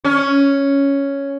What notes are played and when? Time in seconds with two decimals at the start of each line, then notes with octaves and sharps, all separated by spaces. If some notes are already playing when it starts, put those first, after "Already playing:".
0.04 C#4